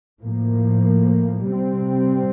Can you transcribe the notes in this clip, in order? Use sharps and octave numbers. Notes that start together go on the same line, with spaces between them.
A2 F3 A#3
C3 G3 C4